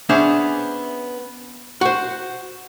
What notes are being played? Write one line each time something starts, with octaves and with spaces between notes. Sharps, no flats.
B3 C#4 D4 G#4 C5 E5
F#4 C5